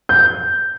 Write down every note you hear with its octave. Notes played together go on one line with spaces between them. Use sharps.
G6